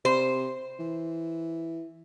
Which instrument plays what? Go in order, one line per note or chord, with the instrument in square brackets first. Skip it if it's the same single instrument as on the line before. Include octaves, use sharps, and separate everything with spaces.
[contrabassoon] C3 [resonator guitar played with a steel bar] C5
[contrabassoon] E3